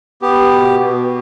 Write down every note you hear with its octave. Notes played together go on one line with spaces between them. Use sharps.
B3 G4
B2
B2